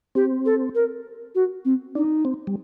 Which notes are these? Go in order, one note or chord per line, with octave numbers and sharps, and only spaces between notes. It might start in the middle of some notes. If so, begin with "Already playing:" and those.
C4 G4
A4
A#4
F#4
C4
D4 D#4
C4
G3